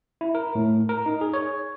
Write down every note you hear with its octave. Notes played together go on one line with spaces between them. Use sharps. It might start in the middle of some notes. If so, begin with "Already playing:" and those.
E4
A#4
A2
A#4
D#4
G#4
C#5